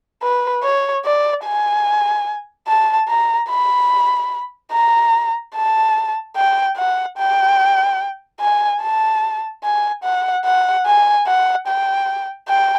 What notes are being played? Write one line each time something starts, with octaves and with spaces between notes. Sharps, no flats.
B4
C#5
D5
G#5
A5
A#5
B5
A#5
A5
G5
F#5
G5
G#5
A5
G#5
F#5
F#5
G#5
F#5
G5
G5